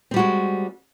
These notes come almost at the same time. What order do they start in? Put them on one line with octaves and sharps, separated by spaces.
C4 G3 F#4 G#3